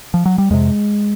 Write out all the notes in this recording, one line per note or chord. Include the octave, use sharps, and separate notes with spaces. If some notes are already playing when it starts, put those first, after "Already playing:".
F3
F#3
G3
F2 C3 G#3